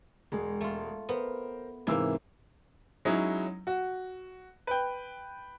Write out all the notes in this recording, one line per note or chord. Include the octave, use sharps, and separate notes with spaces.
E1 G#3
A3 F4
B3 A#4 C5
G#2 C3 E3 A#3 E6
F#3 G#3 C#4 D#4 E4
F#4
B4 G5